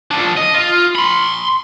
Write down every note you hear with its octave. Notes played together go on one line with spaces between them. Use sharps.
F3 D4
D#5
F4
B5 C6